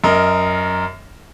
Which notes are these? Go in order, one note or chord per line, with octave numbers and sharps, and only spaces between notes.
F#2 A#4 D#5